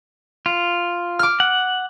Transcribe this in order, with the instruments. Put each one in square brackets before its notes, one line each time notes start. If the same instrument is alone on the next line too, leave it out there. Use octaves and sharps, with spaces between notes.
[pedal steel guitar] F4
[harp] D6 F6
[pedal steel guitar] F#5